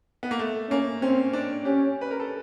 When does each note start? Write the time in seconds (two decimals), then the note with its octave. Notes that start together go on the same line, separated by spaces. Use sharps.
0.23 B3
0.31 A#3
0.39 A3
0.70 A#3 C#4
1.02 C4 C#4
1.33 D4
1.65 C#4 G4
2.01 B4
2.11 A#4
2.20 A4